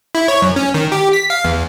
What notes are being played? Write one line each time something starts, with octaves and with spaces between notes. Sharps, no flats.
E4
C#5
F#2
C#4
D#3
G4
B6
F5
E2